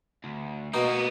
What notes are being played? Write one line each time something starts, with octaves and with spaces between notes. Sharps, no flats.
D2
B2 A#3 B3 D#4